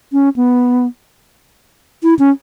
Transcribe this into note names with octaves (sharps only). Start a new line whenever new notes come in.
C#4
B3
E4
C#4